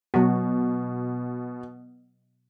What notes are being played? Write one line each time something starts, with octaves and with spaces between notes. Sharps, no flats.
B2 F#3 F#4